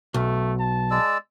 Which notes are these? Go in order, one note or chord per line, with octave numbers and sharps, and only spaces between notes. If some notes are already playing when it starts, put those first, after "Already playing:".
B1 A3
A5
G#3 D5 E6